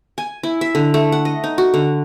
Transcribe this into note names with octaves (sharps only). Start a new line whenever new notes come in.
G#5
E4
E5
D3
A3
F#5
D#5
D#4
F#4
D3